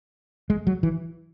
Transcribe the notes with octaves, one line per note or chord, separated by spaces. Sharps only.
G#3
F#3
E3